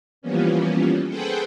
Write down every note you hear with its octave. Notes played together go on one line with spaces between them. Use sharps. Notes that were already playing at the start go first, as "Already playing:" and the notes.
E3 F3 G3 A#3 B3 C#4
G#4 A4 B4 C5 F#5 G5